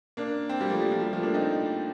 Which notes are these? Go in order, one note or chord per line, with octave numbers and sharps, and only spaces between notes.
A#3 D4
C4
G3 A#3
F3 A3
G3
F3
G3
F3 A3
A#3 D4
C4 D#4